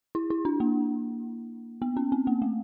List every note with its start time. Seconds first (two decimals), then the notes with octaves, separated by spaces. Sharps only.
0.15 E4
0.30 E4
0.45 D4
0.60 A#3
1.82 B3
1.97 C#4
2.12 C4
2.27 A#3
2.42 A3